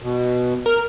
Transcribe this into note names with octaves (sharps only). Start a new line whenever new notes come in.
B2
A#4 F6